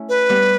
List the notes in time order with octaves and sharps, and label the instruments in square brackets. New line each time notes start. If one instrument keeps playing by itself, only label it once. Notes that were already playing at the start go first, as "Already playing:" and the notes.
Already playing: [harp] A3 C#4 E4
[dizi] B4
[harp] G3 B3